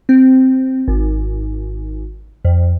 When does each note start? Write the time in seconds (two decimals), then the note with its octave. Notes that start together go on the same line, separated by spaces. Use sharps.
0.09 C4
0.88 G#1
2.45 F2